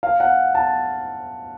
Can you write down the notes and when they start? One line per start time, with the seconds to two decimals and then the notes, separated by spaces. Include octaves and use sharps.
0.03 F5
0.20 F#5
0.55 A5